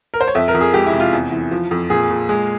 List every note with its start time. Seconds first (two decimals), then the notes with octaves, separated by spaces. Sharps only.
0.14 A#4
0.21 C5
0.28 C#5
0.35 F2 E5
0.48 A#4
0.55 F2
0.61 G#4
0.74 G#3 G4
0.86 E4
0.93 C3
1.00 F4
1.13 E2
1.32 E3
1.51 F3
1.71 F2
1.90 A#2 G#4
2.09 A#2
2.29 G#3